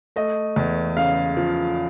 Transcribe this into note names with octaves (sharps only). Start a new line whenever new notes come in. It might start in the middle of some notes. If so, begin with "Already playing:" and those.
A3 D#5
E2
C#3 F5
F3